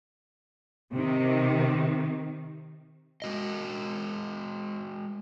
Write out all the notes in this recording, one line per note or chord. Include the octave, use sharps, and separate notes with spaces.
C3 D#3
G#3 F#4 D#5